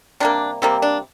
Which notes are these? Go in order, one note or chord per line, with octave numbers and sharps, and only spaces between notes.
C3 G3 A#3 D4
C3 G3 A#3 C4
D4